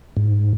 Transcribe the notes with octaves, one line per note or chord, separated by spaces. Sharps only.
G#2